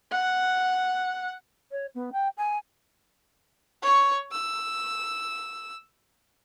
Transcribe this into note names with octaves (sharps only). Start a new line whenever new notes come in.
F#5
C#5
B3
G5
G#5
C#5 C#6
E6